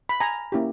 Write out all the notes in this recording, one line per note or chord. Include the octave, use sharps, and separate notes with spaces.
B5
G#5 A#5
A#3 C#4 E4 G4